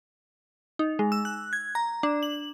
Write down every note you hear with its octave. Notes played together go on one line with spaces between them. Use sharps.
D#4
G#3
E6
F#6
G#6
A#5
D4
F#7